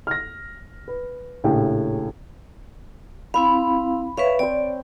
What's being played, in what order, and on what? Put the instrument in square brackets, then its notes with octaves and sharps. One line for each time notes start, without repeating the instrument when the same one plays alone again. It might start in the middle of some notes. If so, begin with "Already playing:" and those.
[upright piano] F6 A#6
B4
A#1 A2 C#3 G4 G5
[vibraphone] C4 E4 F5 [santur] B5
[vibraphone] B4 E5 F5 [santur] C#5
[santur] C4 C5 [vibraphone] D5